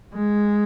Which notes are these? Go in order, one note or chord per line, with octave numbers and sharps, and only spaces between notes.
G#3